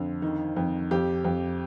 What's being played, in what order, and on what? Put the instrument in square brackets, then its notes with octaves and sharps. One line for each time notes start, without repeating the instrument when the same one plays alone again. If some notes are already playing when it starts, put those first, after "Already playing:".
Already playing: [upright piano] F2 D3
D#3
F2
F2 G4
F2